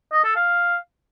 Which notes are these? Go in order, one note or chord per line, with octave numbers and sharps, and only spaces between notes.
D#5
A4
F5